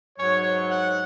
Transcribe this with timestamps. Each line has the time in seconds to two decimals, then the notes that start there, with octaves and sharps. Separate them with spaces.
0.17 G#2 F#3 C#5
0.69 F#5